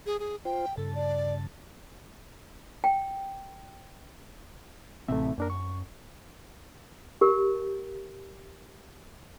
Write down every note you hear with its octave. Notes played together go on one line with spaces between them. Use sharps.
G#4
G#4
F4 C5 G5
G2 C#3 A4 A5
D5
G5
A1 C3 A3 C4 E5
F#2 A#3 D4 A#4
C#6
G4 A#4